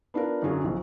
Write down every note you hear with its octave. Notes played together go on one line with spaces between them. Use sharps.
B3 D4 F4 A#4
F#2 D3 F#3 G#4
B1 F3 F#3